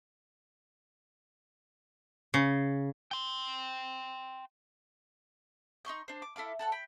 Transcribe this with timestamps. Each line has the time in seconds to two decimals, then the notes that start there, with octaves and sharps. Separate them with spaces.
2.34 C#3
3.11 G5 C6
5.85 D#4 C6 C#6 G6
6.08 D4 C5
6.22 D6
6.36 E4 A4 F5 D6
6.59 A4 F#5 A5
6.72 G5 B5